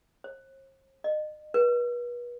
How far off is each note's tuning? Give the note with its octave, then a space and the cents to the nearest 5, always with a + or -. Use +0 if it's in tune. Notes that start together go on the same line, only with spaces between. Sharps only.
C5 +40
D#5 -30
B4 -35